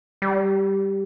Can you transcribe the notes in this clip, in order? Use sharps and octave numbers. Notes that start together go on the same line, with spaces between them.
G3